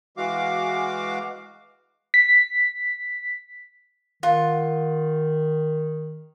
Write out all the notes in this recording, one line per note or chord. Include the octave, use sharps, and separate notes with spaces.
E3 G#3 F#4 F5 D6
B6
D#3 F4 F#5